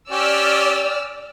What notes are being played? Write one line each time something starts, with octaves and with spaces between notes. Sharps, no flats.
C#4 G4 D5 E6 F6